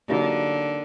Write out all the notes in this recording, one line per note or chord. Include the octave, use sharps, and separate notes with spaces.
D3 F#3 A#3 D#4 G4